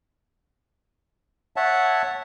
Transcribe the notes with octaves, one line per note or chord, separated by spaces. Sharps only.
C#5 E5 F#5 A5